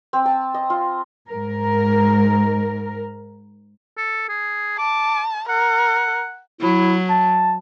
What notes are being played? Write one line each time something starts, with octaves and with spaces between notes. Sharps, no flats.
C4
A5
D#5
F4
G#2 A#4
A4
G#4
A5 D6
A#4 F#5
F#3 E4
A5